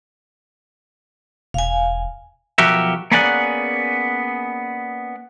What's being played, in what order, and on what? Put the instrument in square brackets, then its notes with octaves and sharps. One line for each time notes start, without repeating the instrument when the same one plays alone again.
[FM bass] E1 [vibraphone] F5 G#5
[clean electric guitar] B1 F3 F#4 G4 A#4 E5
A#3 B3 C#4 G#4 D5 F#5